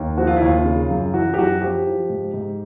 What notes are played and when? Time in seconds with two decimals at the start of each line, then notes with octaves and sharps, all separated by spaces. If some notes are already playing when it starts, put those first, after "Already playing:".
Already playing: D#2
0.17 F3 F#4
0.27 F4
0.36 E4
0.41 D#2 F4
0.65 C#3
0.90 F#2
1.13 E3 F#4
1.34 G4
1.38 F#2 F#4
1.62 F3 G4
1.86 F3
2.10 G#2
2.34 G#2